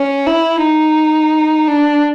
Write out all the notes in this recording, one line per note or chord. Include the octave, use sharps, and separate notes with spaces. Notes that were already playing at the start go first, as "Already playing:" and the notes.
Already playing: C#4
E4
D#4
D4